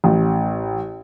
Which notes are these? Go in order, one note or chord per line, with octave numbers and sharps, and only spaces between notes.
A1